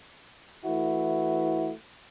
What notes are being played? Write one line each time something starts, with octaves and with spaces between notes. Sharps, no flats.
E3 A3 E4 F#4